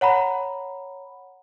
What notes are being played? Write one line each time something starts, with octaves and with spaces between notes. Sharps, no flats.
C#5 F#5 A#5 B5